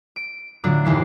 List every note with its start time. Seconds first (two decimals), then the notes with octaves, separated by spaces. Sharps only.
0.16 D7
0.64 A2 D3 F#3 D4 F4 F#4
0.85 F#1 D#2 E3 C7